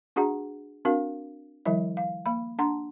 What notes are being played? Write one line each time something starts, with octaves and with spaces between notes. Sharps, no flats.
D4 F#4 G#4 F#5 A#5
C4 D4 F#4 A#4 F5
D#3 F3 G3 E4 E5
F5
A#3 B5
D4 F#5 A5 A#5 C6